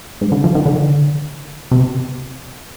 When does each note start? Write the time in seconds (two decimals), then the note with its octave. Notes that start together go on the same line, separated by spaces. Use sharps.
0.21 G#2
0.32 D3
0.44 F3
0.55 D#3
0.66 D3
1.71 C3